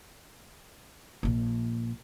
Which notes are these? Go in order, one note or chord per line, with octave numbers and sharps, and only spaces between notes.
A#1 A#3